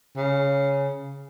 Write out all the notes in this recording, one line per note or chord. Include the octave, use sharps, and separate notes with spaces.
C#3